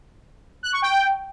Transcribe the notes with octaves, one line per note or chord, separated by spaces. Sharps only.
F#6
C#6
G5